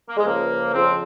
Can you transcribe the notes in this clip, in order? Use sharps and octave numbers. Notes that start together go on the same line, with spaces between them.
A#3
G#3
C#2 C#3 F3 A#3
F2 C#3 F3 C4